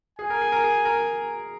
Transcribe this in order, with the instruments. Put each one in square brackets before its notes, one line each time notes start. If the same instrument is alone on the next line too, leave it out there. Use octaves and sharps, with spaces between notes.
[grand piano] G#4 [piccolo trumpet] G#5
[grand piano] A#4
G#4
A#4
G#4
A#4